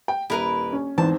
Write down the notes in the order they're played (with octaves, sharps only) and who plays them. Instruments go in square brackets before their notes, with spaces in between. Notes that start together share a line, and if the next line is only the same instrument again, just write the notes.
[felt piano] G5
[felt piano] D#1 [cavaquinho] E4 A#4 B4
[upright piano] C#4
[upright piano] E2 G#2 [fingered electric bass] E3 [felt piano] C4 [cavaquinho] A5